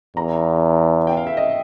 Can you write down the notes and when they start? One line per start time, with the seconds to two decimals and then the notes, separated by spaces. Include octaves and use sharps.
0.17 E2 A#5
1.07 G5
1.17 F5
1.27 E5
1.37 D#5